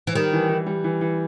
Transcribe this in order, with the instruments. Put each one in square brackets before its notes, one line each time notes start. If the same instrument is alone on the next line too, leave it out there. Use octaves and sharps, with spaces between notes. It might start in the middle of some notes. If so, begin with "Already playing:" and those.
[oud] E3
[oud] D#3 [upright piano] G3
[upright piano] E3
E3
G3
E3
E3